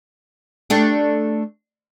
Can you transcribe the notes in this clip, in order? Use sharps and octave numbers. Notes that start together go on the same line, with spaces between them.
A3 D4 G4